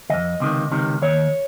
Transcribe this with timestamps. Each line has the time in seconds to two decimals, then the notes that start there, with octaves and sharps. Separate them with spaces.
0.10 F2 D#3 D#5
0.40 C#2 C3 D#3
0.71 C#2 C3 D#3
1.02 D#2 D#3 C#5